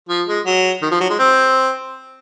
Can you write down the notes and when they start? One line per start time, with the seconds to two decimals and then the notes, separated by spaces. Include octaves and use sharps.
0.09 F3
0.27 G#3
0.46 F#3
0.82 D#3
0.91 F3
1.00 F#3
1.10 G#3
1.19 C4